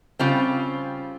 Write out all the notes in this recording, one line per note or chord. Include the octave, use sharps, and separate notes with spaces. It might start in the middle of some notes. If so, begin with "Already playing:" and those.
C#3 G3 C4 F4